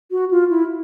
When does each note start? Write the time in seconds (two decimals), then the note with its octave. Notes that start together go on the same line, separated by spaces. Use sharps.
0.11 F#4
0.31 F4
0.50 E4